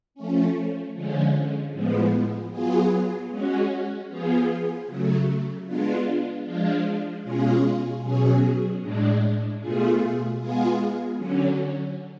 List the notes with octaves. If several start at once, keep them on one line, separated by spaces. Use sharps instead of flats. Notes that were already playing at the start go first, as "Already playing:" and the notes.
F3 A3 C#4
D3 F3 G#3 C#4
A2 F3 G#3 B3
F#3 B3 F4 G#4
G#3 C#4 F#4
F3 B3 F4 G#4
C#3 F#3 A3
G#3 B3 D4 F4
F3 G#3 D4 F4
B2 G#3 C#4 F4 G#4
B2 F#3 C#4 G#4
A2 G#3 D4
B2 A3 F4 G#4
G#3 B3 F4 G#4
D3 F#3 C#4